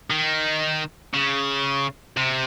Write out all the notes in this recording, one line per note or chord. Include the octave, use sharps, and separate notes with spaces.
D#3
C#3
C3